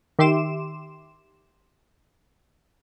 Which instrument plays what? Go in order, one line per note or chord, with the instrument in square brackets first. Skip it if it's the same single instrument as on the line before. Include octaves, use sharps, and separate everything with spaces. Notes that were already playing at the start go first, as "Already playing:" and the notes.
[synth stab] D#3 G4 E5 C6 D6 E7